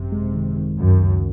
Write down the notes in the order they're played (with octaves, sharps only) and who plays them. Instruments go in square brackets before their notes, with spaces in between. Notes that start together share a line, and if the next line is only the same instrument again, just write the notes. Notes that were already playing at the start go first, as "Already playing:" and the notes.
Already playing: [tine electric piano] G#1 F#2 [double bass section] C3
[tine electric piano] G#3
D#3
D#3
[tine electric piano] C#2 [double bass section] F#2
[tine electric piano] C#2